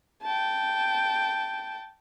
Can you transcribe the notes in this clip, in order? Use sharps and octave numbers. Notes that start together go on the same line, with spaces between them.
G5 A5